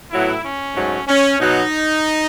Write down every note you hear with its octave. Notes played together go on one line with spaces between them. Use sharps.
A2 F#3 B3 E4
C#4
G#2 F#3 A3
C#4
B2 F#3 B3 D#4